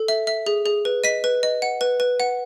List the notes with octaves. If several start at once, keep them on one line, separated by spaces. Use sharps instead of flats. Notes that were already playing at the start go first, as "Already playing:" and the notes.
Already playing: A4
E5
E5
G#4
G#4
B4
D#5 B6 D#7
B4
D#5
F#5
B4
B4
F#5